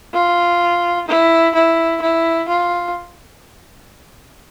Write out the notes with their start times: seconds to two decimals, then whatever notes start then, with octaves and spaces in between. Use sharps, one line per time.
0.13 F4
1.07 E4
1.54 E4
2.01 E4
2.48 F4